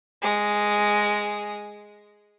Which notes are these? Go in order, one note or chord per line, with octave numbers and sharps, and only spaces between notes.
G#3 D#6